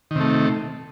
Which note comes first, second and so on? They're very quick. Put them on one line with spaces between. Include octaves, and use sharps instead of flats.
D#3 C3 A3